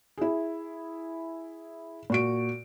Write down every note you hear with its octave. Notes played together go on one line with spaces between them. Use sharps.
E4 G#4
A#2 F#4 D7